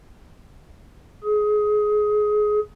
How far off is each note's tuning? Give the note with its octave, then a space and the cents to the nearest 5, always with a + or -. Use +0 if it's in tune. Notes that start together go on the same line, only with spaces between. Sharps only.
G#4 +20